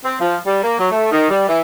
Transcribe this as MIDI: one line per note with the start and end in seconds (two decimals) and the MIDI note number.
0.04 0.15 60
0.20 0.36 53
0.46 0.60 55
0.63 0.77 58
0.78 0.87 54
0.91 1.11 57
1.11 1.30 51
1.30 1.46 55
1.48 1.61 52